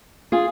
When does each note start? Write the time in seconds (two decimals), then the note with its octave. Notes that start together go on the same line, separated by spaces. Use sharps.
0.32 F4 G#4